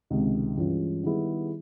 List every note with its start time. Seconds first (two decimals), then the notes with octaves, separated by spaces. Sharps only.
0.10 C#2 C3 D#3
0.56 G2 E3 G#3 C#4 F4
1.03 D#3 G3 B3 E4 G#4